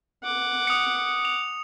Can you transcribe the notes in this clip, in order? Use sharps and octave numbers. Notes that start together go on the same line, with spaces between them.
F#5 D6
D#6 C#7
F7